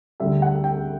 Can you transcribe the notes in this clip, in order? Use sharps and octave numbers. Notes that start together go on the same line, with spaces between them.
D2 D3 G3 E5
F#5
G5